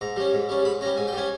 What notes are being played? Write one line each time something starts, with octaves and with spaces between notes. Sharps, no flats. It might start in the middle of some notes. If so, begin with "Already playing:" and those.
G#2 A#5
G3 C#4
G#2
G3 C#4
G#2 B5
G3 C#4 A#5
G#2 G#5
G5
G3 C#4 G#5